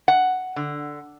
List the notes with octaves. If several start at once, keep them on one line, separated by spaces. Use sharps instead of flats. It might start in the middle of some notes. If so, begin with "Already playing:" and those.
F#5
D3